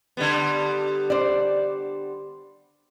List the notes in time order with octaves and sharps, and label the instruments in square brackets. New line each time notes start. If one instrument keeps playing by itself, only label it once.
[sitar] D3 G3 B3
[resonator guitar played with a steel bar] C5 D5